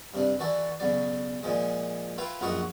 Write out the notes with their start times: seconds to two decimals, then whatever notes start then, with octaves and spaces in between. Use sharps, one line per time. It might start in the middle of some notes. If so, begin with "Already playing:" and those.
0.14 G2 C3 D4
0.39 E3 F#4 A4 D5
0.80 B1 C#3 F#3 D5
1.43 A#2 F3 G#3
2.18 E4 F4 B4 F5 G5
2.41 A#1 F#2 F4 F#4 D#5 F#5